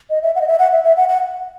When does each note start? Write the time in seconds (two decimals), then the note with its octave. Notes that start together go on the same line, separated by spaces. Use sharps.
0.10 D#5
0.22 E5
0.35 F#5
0.41 D#5
0.47 E5
0.59 F#5
0.72 E5
0.84 E5
0.97 F#5
1.08 F#5